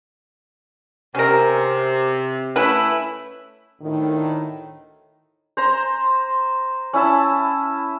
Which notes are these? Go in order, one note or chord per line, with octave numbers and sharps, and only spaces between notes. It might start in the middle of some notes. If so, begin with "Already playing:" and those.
C3 C#4 A#4
A3 C#4 E4 B4
D2 A2 D#3
C5 A#5 C6
C#4 E4 E5 A5